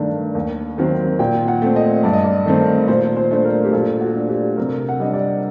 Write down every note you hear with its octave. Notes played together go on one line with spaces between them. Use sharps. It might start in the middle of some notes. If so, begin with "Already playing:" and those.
Already playing: G2 D#3 A3 D4
D#2
D#3 F#3 C4
A#2 G5
F#5
A3 C4
D#5
G2 D5
D#5
D5
D#3 A3 C4
A#2 C5
C5
A3 D4 C5
A#4
G4
A#2 A4
F#4
A3 D4
G4
C3 A#4
F#5
G3 D4 D#5
D5